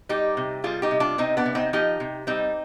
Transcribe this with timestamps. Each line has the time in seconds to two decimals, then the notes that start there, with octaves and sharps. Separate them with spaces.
0.09 G3 D#4 G4
0.37 C3
0.64 G3 F4 G#4
0.82 D#4 G4
0.91 C3
1.00 D4 F4
1.18 C3 C4 D#4
1.37 B3 D4
1.45 C3
1.55 C4 D#4
1.73 F3 D#4 G4
2.00 C3
2.27 G3 C4 D#4